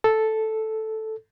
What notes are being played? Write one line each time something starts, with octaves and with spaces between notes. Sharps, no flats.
A4